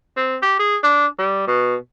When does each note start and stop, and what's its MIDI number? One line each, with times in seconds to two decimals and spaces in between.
0.17 0.37 60
0.42 0.55 67
0.59 0.77 68
0.83 1.06 62
1.19 1.47 55
1.47 1.76 47